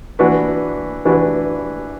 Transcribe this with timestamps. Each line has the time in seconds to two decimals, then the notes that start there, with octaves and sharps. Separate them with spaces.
0.19 E3 D4 F#4 B4
1.05 E3 D4 F#4 B4